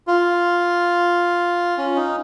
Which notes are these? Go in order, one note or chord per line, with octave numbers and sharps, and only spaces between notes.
F4
C#4
D#4